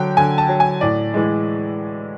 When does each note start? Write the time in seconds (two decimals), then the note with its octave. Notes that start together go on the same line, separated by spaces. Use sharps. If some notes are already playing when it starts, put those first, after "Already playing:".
Already playing: D3 F#3 G5
0.17 D3 G#5
0.38 A5
0.49 F#3
0.60 G#5
0.81 A2 D5
1.14 E3 G#3